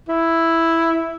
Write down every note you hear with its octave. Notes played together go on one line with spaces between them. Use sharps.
E4